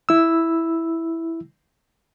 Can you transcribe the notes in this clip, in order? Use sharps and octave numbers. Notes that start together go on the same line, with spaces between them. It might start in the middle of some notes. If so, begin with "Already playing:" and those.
E4 E6